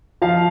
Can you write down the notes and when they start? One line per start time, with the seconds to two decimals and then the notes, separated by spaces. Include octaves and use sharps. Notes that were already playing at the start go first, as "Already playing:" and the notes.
0.22 F3 F5